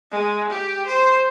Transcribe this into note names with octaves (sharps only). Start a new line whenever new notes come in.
G#3
G4
C5